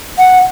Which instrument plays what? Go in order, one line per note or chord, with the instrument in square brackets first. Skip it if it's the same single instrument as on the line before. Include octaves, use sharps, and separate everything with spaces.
[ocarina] F#5